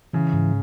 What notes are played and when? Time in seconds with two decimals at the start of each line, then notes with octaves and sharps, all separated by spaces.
0.13 C#3 E3
0.33 G#2